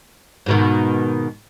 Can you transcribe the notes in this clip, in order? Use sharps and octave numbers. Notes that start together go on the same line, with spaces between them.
G#2 B2 D#3